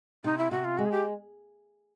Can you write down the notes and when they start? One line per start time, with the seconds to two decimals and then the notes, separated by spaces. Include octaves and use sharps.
0.24 C3 D#4
0.38 E4
0.51 C3 F#4
0.64 F4
0.78 G#3 F#4
0.85 G#4
0.92 G4